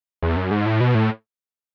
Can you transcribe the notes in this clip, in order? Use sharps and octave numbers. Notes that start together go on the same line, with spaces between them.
E2
F#2
G#2
A2
B2
A2